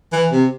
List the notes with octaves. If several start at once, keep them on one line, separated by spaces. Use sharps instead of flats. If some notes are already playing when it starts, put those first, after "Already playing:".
E3
C3